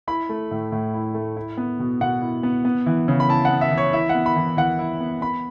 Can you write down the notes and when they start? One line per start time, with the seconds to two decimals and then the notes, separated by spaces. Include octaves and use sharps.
0.07 E4 B5
0.29 A3
0.51 A2
0.72 A2
0.94 E4
1.14 A3
1.37 E4
1.57 B3
1.80 B2
2.01 B2 F#5
2.21 E4
2.43 B3
2.65 B3
2.86 E3
3.08 C#3
3.20 B5
3.29 E4 A5
3.45 F#5
3.51 B3
3.61 E5
3.71 E3
3.77 C#5
3.93 E4 E5
4.09 F#5
4.14 B3
4.26 B5
4.36 E3
4.57 E3 F#5
4.79 E4
5.00 B3
5.21 B3 B5